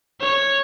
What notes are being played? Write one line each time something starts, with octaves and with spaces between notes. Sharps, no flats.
C#5